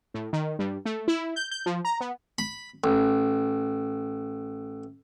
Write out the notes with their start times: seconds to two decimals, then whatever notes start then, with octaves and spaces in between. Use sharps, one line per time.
0.14 A2
0.33 D#3
0.59 G2
0.85 A3
1.08 E4
1.36 G6
1.51 G6
1.66 F3
1.85 A#5
2.01 B3
2.38 B5
2.84 A1